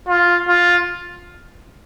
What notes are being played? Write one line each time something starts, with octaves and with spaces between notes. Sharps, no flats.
F4
F4